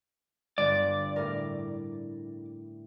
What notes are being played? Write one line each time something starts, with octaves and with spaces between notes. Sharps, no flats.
G1 D5
A2 A#4